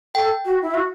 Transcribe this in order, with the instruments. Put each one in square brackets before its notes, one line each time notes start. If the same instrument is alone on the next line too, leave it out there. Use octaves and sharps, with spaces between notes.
[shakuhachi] A4 [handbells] G5
[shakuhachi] F#4
E4
F#4